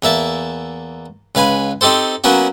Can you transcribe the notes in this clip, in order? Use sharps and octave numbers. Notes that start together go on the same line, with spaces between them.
E2 A#3 E5 A5
C#2 B4 F5 G#5 B5
C4 D#4 G4 A4 C5
F#3 A#3 B3 C#4 F#4